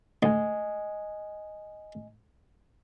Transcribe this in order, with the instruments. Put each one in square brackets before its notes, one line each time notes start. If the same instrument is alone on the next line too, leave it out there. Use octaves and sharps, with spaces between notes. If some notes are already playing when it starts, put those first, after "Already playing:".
[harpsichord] D2 [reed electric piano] D#5 G#5